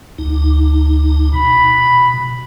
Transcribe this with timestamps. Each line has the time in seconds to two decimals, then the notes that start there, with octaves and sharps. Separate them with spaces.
0.18 D2 D#4
1.33 B2 B5